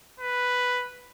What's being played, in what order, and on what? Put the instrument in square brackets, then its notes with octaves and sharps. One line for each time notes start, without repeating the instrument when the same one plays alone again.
[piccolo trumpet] B4